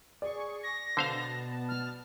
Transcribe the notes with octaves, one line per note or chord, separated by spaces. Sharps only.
G#4 D5 C#6
A#6
B2 D3 B3 C5 F5 A5
F6